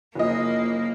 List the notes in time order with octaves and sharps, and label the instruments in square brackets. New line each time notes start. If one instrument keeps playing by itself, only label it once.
[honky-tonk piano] F#1 F3 D#5 [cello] A#3